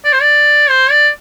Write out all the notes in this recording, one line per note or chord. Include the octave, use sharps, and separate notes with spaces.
D5
C5
D5
C5
D5